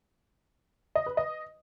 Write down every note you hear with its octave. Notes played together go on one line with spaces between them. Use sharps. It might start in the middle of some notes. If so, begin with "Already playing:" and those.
D#5
B4
D#5